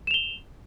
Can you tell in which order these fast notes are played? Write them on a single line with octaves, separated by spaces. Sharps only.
E7 F7 G7